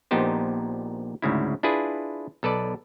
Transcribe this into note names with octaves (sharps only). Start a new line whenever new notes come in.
A#1 A#2 B3 D#4 G4 C5
D2 G#2 C#3 E4
D4 E4 F4 G#4 B4
B1 A4 B4 D5